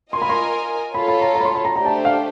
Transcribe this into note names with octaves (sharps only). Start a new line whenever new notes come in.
F4 A#4 D#5 G#5 C6
B5
C6
F4 A4 C#5 B5
B5
A#5
A#5
B5
C6
B5
A#5
A3 D4 G4 C5 A#5
A5
F5